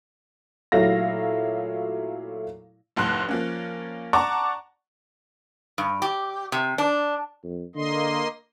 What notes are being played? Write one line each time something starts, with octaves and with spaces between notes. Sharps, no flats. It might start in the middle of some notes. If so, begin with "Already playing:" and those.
A#2 F#3 A3 E4 F5 A#6
F1 C2 A2 C6 F#6
F3 A#3 C#4
D5 F#5 A5 A#5 C#6 D6
G2
G4
C3
D4
F2
D3 A#3 D#5 C6